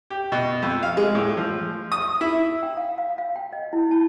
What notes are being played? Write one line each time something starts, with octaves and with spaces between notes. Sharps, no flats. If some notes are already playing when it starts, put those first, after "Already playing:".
G4
B2
F2
F5
G#3
A2
F3
D#6
E4
G5
F5
F5
F5
G5
D#5
E4
A5